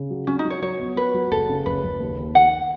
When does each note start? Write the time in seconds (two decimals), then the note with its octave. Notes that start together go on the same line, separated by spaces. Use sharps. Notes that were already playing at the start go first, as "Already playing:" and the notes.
Already playing: C#3
0.10 F#3
0.27 F#3 C#4
0.39 D#4
0.45 F#3
0.50 C#5
0.62 F#3 C#5
0.80 B3
0.96 F#3 B4
1.14 F#3
1.31 F#1 A4
1.49 C#3
1.66 F#1 B4
1.84 F#1
2.00 D#2
2.19 D#2
2.35 D#2 F#5